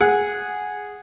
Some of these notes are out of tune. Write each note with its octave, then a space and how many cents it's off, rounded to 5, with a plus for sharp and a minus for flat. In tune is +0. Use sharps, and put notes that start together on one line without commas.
G#4 -5 F#5 -5